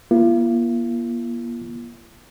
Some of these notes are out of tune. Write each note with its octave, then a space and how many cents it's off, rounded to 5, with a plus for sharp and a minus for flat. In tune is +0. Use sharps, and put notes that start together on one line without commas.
A#3 +40 F4 -45